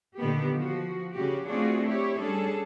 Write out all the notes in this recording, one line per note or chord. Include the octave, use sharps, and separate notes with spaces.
A#2 D3 D#3 B3 G4
F3 F#4
C#3 F#4 G4
A3 C4 D4 F4 F#4 G#4
E4 G4 C#5
G3 C#4 D4 G#4 A4